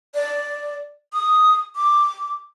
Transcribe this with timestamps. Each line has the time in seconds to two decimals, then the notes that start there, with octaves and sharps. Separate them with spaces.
0.15 D5
1.13 D#6
1.76 D6